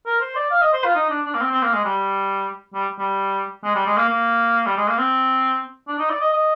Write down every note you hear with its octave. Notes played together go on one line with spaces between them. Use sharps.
A#4
C5
D5
F5
D#5
C5
F4
D#4
D4
D4
A#3
C4
C4
A#3
G#3
G3
G3
G3
G#3
G3
G#3
A#3
A#3
G3
G#3
A#3
C4
D4
D#4
D5
D#5
D#5